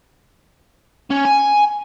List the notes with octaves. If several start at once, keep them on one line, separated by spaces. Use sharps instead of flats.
C#4
G#5